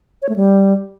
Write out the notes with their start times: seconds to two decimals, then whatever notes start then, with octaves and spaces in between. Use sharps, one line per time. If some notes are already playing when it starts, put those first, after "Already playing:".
0.22 C#5
0.29 A3
0.36 G3